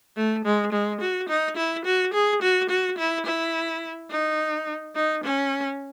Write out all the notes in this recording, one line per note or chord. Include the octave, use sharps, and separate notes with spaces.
A3
G#3
G#3
F#4
D#4
E4
F#4
G#4
F#4
F#4
E4
E4
D#4
D#4
C#4